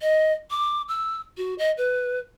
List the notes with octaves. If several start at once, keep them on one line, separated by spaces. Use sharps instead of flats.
D#5
D6
E6
F#4
D#5
B4